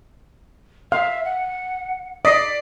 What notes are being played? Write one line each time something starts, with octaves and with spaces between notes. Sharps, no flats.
E5 F5
F#5
D5 D#5 B6 C7